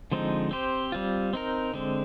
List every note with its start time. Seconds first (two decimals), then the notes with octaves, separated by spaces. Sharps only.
0.12 D3 F3 G#3 C4 D#4
0.51 C4 G4 C5
0.92 G3 C4 F4
1.33 C4 D#4 A#4
1.74 D3 G#3 C4